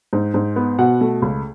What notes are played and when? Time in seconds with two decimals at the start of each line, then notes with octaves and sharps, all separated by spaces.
0.13 G#2
0.34 G#2
0.56 B3
0.78 B2 F#5
1.01 A3
1.22 C#2